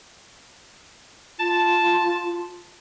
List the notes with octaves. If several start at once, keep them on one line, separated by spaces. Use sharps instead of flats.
F4 A5